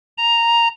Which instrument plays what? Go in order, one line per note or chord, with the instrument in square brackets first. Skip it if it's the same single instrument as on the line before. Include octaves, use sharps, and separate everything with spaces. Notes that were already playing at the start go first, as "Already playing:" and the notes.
[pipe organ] A#5